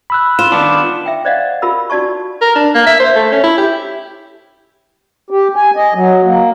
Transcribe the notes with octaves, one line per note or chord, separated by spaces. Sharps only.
B5 E6 F#6
F4 E7
D#3 B3 D4
E5 G5
C5 D5 D#5 F5 F#5
F4 G4 A#4 B5 E6
D#4 F#4 D5 A5 C#6
A#4
D4
A#3
E5
C5
A3
C#4
E4
G4
G4
G#5
D#5
F#3
A#3